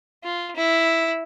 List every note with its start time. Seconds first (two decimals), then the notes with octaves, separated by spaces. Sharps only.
0.24 F4
0.56 E4